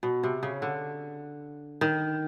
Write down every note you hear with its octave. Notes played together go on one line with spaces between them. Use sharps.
B2
C3
C#3
D3
D#3